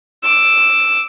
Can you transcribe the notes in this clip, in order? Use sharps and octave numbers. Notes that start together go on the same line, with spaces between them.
D6 E6